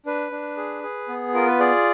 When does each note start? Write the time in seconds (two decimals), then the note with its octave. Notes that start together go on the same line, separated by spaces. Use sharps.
0.06 D4 B4
0.31 D4
0.57 G#4
0.83 G#4
1.08 B3
1.34 F4 A#4
1.47 B4
1.59 G#4 D5